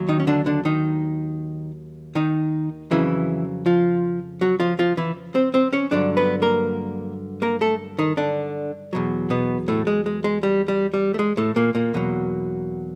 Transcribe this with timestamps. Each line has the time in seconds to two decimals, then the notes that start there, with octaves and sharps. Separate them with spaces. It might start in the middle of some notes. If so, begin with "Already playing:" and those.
Already playing: D#2 F#3
0.08 D#3 D#4
0.20 C#4
0.27 D3 D4
0.46 D3 D4
0.65 D#3 D#4
2.15 D#3 D#4
2.91 F2 C#3 E3 F#3 E4
3.66 F3 F4
4.41 F#3 F#4
4.60 F3 F4
4.79 F3 F4
4.97 E3 E4
5.35 C4 C5
5.54 C4 C5
5.73 C#4 C#5
5.91 G2 D3 F#3 D4 D5
6.17 B3 B4
6.42 A#3 A#4
7.42 A#3 A#4
7.61 A3 A4
7.99 D#3 D#4
8.17 D3 D4
8.93 E2 B2 F#3
9.30 B2 B3
9.68 A2 A3
9.87 G#3
10.06 G#3
10.24 G#3
10.43 G3
10.68 G3
10.94 G3
11.14 A3
11.19 G#3
11.37 A2 A3
11.56 A#2 A#3
11.75 A#2 A#3
11.94 E2 B2 F#3